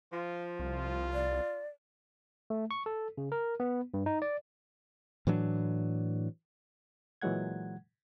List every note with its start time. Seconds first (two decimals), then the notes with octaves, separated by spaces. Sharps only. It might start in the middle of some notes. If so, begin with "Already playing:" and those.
0.13 F3 F4
0.59 C2 F4
1.13 D5
2.50 A3
2.71 C#6
2.86 A4
3.18 C#3
3.32 A#4
3.60 B3
3.94 G2
4.06 D#4
4.22 D5
5.27 A2 E3 F#3 D4
7.22 A#2 E3 F#3 G#3 F#5 G#6